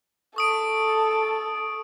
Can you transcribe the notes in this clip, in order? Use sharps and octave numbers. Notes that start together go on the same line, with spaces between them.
A4 C#6 D#6 D7